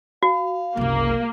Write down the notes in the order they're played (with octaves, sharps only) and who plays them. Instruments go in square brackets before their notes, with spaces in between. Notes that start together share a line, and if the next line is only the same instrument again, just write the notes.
[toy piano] F#4 [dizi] F5
[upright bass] F#1 C2 [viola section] A#3